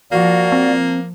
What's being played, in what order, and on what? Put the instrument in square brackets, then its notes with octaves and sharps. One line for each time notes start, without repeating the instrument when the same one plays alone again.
[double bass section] F3 [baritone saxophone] A#3 [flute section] F#4 D5 F5
[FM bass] C4